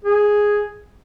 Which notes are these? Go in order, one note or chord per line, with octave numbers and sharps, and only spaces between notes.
G#4